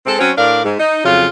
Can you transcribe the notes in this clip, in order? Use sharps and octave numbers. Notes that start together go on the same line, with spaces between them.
G#3 C4 A4
F#3 C4 C#4
A2 D4 A#4 D5 F5
G#2
D#4
F2 C#3 F#3 F4